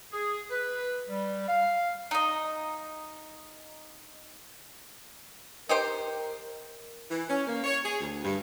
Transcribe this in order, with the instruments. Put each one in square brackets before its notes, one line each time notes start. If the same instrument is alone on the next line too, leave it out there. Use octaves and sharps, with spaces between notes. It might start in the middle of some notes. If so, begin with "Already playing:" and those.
[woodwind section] G#4
B4
G3
F5
[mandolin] D#4 D#5
[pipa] D#4 G4 C5 [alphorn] A#4
[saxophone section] E3
C#4
A#3
C#5
G#4
D2
G2